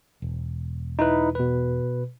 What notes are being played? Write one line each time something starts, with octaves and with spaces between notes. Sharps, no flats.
E1
D#4 E4 B4
B2 B4